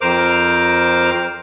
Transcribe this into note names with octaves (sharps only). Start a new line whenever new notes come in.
F2 A#4 C5 D6 F6